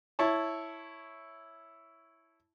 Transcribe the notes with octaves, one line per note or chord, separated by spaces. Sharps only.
E4 C#5 A5